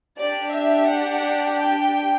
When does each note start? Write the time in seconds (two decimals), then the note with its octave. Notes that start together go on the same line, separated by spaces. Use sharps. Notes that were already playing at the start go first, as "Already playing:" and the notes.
0.18 D4 G4 D5
0.53 E5
0.89 F#5
1.59 G5